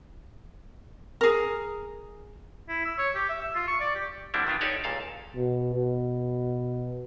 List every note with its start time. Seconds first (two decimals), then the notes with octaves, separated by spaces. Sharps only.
1.21 G#4 A#4
2.69 E4
2.85 E6
2.98 C#5
3.15 G4
3.29 E5
3.41 E6
3.55 F4
3.67 C#6
3.80 D5
3.95 G4
4.34 D3 G3 C4 D4 E4
4.47 D#3 B3 D4 F4
4.61 D#4 G4 A4 C#5 D5
4.84 C#2 A#2 A4 F5
5.35 B2
5.74 B2